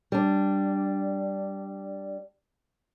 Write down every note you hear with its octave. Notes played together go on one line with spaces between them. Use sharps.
G3 D4